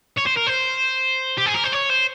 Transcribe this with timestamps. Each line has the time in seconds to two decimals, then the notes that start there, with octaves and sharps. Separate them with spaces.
0.18 C#5
0.27 C5
0.37 A#4
0.47 C5
1.38 G4
1.46 G#4
1.54 A#4
1.64 C5
1.72 C#5
1.89 C5